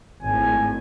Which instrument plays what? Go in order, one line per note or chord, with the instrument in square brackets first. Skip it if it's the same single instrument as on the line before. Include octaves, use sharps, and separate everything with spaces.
[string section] G#1 A2 [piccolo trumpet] G#5